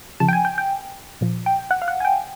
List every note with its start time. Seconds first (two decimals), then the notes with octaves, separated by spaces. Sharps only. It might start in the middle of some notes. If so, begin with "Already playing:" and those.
0.20 C#3 F3 A5
0.28 G5
0.33 G#5
0.45 G5
0.58 G5
1.21 A#2 F3
1.46 G5
1.71 F#5
1.82 F5
1.88 F#5
2.00 G#5
2.05 G5